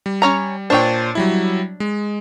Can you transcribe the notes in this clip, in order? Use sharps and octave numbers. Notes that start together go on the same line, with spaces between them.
G3
C#4 C#5 A#5
A#2 D4 C5 C#5 G5
F#3 G3 E4
G#3